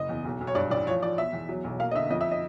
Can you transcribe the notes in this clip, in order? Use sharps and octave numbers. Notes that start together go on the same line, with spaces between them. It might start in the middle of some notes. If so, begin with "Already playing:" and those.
Already playing: F#1 D#5
E2
B1
B1
C#5
G2 D5
A1 D5
F3 C#5
F3 D5
B2 E5
E2
F#3
B1
A#3 F5
D#5
D3 E5
F2 D#5
E5
D#5